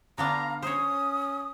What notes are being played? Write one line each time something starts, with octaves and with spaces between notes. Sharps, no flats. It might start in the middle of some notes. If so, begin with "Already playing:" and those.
D3 B3 D4 F5 A#5
C#4 C5 C#5 D#6